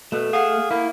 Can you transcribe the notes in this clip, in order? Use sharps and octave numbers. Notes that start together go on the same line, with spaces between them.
B2 A3 B4
G#4 F5 F#5 F6
A#3 E4